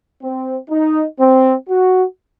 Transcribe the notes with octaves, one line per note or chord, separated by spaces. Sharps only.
C4
D#4
C4
F#4